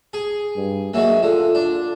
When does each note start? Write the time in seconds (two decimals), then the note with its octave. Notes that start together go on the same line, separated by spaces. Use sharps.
0.13 G#4
0.56 G2
0.94 E3 F#3 G#3 A#3
1.23 D3 F4
1.55 D4